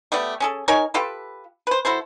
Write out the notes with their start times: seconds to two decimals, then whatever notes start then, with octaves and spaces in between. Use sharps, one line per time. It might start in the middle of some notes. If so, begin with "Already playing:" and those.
0.12 A3 B3 G4 D5
0.40 C#4 G#4 A4
0.68 D#4 A#4 C#5 G#5
0.94 F4 G4 A4 B4
1.67 B4 C5
1.85 F#3 E4 A4 C5